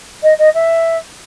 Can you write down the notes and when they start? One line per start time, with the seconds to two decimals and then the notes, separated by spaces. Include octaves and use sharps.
0.23 D#5
0.38 D#5
0.54 E5